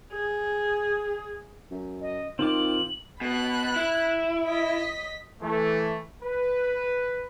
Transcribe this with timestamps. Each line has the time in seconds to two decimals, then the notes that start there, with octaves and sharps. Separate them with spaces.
0.13 G#4
1.71 F#2
2.01 D#5
2.39 D#3 C4 F4 D6 F#7
3.21 B2 B5 F#6
3.76 E4
4.47 D#5 B6
5.42 E3 A3
6.22 B4